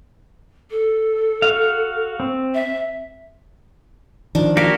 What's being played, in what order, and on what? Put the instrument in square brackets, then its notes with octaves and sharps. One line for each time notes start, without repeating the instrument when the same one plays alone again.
[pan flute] A4
[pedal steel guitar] F#4 F5
C4
[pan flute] E5
[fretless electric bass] D#3 F3 [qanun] D4
[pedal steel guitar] A#3 F#4 G4 [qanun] F5